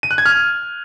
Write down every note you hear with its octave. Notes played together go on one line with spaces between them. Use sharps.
D#7
F#6
G#6
F6